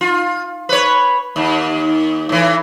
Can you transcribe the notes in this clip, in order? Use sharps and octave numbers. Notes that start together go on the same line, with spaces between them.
F4
B4 C#5
D#2
A2 E3